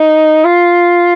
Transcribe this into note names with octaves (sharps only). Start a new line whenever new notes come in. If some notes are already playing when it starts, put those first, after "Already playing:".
Already playing: D#4
F4